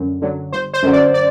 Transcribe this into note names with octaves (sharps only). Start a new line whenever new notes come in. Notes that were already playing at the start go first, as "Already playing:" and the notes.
Already playing: F#2 D3 F#3
D3 F#3
G1 C5
C5
F#2 D3 F#3
D5
D5